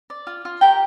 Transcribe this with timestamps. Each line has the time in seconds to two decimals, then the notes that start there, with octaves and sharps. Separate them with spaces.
0.10 D5
0.27 F4
0.45 F4
0.61 G4 A#4 G5